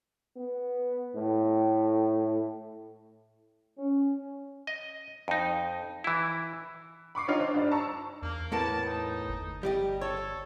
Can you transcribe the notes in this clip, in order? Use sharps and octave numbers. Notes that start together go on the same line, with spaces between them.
B3
A2
C#4
D#5
F2 D#4
E3 E4
B5 C#6 D6 C7
D4 D#4 F4 C#5
D4 C5
G2 D#4 D5
A5 A#5 C#6 E6
E2 A#3
A2 B3 A#4 A5
D#4
G1
G3 G4 D#5
A4 C#5